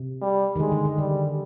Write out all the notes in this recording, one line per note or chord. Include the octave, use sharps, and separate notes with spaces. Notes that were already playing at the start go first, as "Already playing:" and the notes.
Already playing: C3
G3
D#3
D3 G#3
D#3
D3
D3 G3